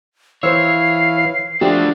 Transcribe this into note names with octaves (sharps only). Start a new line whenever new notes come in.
E3 C5 C#5 F5 E6 C7
F3 A3 D4 F#4 G4